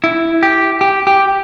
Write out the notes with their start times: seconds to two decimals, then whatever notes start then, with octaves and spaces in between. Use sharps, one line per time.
0.04 E4
0.43 G4
0.81 G4
1.07 G4